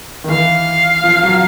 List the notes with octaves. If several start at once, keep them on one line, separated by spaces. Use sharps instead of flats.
D#3
E3 F5
F3
F#3